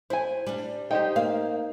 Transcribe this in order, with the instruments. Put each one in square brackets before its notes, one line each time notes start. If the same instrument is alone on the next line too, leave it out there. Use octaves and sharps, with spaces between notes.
[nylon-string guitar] E4 [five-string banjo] C5 G#5
[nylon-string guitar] G3 D4
[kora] D#4 C5 [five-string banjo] G4 D#5 G5
[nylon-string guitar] A#3 [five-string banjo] F5